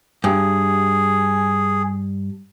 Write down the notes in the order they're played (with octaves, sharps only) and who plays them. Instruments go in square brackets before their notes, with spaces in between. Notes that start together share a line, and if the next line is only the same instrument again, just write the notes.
[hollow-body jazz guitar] G2 [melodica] G#4